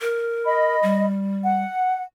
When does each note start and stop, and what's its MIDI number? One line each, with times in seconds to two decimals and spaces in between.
0.01 0.76 70
0.45 1.06 75
0.45 1.06 83
0.83 1.64 55
1.42 2.04 78